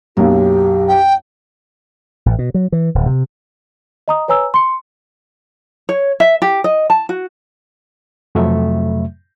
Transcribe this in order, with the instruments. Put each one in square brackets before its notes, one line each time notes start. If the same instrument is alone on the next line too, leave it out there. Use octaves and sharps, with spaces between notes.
[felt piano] B1 F#2 A#3 [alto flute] G4
[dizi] G5
[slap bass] A1
B2
F#3
E3
D1
C3
[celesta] D#5 A#5 D#6
B4 C#5 G#5 A#5 E6
C6 C#7
[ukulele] C#5
E5
G4
D#5
A5
F#4
[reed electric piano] F2 C3 F#3 A3 E5